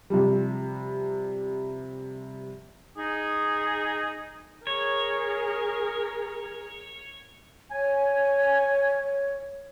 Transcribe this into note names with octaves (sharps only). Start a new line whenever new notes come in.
C3 F3 G3
D#4 G#4
G#4 A#4 C#5
C#5 G#5